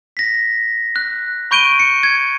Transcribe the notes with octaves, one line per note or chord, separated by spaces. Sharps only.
A#6 B6
F#6
B5 C#6 G6 D7 D#7 G7
C#7
G#6